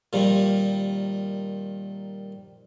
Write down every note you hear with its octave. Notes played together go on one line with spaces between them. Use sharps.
A#2 D#3 F3 G3